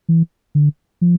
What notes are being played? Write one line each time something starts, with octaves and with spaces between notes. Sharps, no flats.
E3
D3
F3